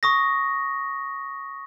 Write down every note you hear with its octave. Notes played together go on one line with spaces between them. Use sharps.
C#6 D#6 A#6